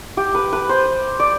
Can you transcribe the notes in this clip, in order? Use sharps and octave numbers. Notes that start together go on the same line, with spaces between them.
G4
B4
B4
C5
D5